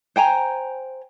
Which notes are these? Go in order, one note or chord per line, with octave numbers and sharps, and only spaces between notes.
C5 G5 G#5 A#5